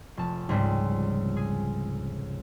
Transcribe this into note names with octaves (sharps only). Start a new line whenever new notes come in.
F1 A5
C#2 G#2 G3 C4
G#4